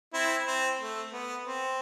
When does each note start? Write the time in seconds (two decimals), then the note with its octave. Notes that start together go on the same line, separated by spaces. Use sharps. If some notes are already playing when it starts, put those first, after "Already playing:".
0.14 C4 E4
0.47 C4
0.80 A3
1.13 B3
1.45 C4